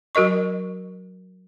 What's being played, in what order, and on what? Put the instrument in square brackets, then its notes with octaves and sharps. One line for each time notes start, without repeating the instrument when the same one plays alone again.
[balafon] F#3 F#4 A#4 D#5 C#6